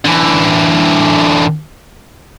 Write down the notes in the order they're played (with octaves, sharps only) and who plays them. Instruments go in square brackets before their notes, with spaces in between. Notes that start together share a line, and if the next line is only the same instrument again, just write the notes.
[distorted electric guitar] D3 E3